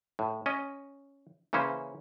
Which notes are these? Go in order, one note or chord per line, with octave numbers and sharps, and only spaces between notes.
A2
C#4 D#5
C#3 E3 A#3 C#4 C5